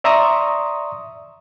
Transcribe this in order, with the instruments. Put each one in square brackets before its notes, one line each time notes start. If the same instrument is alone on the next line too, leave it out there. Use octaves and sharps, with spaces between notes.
[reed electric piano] D5 E5 A#5 C6 C#6 D#6